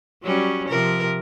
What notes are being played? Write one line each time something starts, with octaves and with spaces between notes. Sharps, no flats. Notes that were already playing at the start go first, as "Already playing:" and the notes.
F#3 G3 C#4
C3 F3 A#4